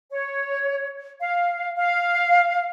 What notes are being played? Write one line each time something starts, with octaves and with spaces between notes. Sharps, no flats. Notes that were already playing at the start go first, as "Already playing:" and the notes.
C#5
F5
F5